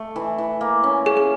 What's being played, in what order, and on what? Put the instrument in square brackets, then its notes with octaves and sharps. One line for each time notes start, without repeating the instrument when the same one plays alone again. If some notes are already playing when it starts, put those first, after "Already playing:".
Already playing: [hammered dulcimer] A3
E3
E3
A#3
C#4
[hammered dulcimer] C#4 [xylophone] G#4
[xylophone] G#4